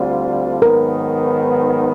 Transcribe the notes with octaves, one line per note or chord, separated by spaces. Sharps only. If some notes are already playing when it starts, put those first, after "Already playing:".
Already playing: D2 D3 G3 C4 F4
G#2 D#3 F#3 B3 A#4